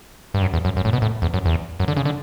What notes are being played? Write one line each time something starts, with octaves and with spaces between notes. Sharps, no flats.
G2
F#2
E2
F#2
F#2
A2
B2
A2
E2
F#2
E2
F#2
D3
C#3
D3